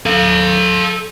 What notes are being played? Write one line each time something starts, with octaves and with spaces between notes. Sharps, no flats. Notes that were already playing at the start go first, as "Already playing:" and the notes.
A4 F5